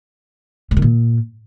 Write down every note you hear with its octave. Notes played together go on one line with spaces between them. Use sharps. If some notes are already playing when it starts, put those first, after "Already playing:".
A2
D#3
A#2